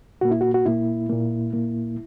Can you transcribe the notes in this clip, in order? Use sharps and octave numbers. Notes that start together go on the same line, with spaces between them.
A#2 A#3 F#4
E4
F#4
F#4
A#2 A#3 E4
A#2 A#3
A#2 A#3